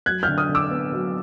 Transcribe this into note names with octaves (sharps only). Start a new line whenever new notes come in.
F#3 F#6 G#6
F6 G6
D3
D#6 F6
D3
D6 E6
B3
F#3